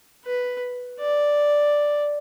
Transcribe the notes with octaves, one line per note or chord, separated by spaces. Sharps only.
B4
D5